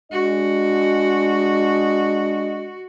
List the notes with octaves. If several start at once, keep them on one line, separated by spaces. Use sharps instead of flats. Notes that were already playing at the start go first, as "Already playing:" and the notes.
G#3 D4 F#4 D#5